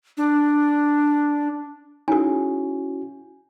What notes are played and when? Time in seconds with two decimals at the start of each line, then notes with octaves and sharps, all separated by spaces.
0.17 D4
2.08 C#4 D#4 E4 F#4 G#4 G#5